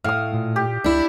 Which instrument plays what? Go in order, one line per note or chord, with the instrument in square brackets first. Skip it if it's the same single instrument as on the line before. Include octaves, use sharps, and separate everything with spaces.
[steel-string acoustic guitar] A2 [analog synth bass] A3 [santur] F5 D#6
[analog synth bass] A#2
[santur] G4
[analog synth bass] C#2 [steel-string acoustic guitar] D4 E4